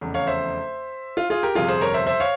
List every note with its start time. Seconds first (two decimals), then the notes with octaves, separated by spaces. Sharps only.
0.01 F1 E2 C#3
0.14 C#5 F5
0.27 C5 E5
1.17 F4
1.30 F4 G#4
1.43 G4 A#4
1.55 G1 F2 C3 F4 G#4
1.68 G#4 C5
1.81 A#4 C#5
1.94 C5 E5
2.07 C5 E5
2.20 C#5 F5